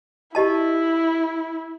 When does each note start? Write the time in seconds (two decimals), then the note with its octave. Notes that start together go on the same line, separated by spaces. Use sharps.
0.35 E4 G4 D#5 A5